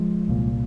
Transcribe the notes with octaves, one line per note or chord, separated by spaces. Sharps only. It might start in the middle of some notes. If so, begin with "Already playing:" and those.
Already playing: F3 G#3
C2 A#2